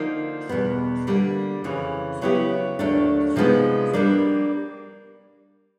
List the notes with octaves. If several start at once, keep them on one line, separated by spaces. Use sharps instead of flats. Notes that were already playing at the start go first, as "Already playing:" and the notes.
Already playing: D3 F3 A#3 D#4
E2 B2 G3 B3
D3 G3 A#3
F2 C#3 E3
C#3 F#3 B3 E4 G4
D#2 D3 F#3 A3 D4
C3 F3 G#3 B3 D#4
G3 A#3 D4